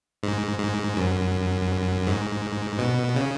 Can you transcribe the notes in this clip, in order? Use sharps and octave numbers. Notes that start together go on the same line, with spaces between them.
G#2
G#2
F#2
G#2
B2
C#3